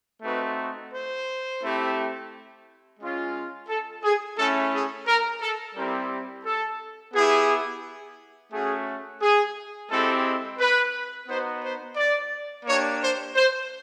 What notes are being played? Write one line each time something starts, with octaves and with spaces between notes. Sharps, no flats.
A3 C4 D#4 F#4 B4
C5
A3 C4 E4 G4
G#3 C#4 F4
A4
G#4
A3 C#4 E4 A4
G#4
A#4
A4
G3 C4 E4 G4 A#4
A4
B3 E4 G4 G#4
A3 C#4 F#4 G#4
G#4
G#3 C4 E4 G4 A4
B4
B3 D#4 F#4 C5
C5
D5
A#3 D4 G4 C#5
C5
C5